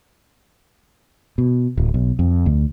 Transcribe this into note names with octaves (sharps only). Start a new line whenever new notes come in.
B2
D1
B1
F2
D2